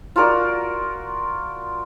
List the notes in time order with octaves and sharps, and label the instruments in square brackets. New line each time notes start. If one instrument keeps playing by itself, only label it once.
[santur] F4 F#4 A#4 D5